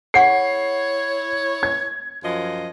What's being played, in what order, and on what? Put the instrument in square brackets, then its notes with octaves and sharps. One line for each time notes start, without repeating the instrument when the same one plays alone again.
[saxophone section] E4 C#5 [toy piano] G#4 F#5 C#6 [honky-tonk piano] C7
[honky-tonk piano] G#6
[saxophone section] F#2 F3 D#5